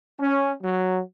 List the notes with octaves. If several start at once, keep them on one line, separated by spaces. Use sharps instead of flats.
C#4
F#3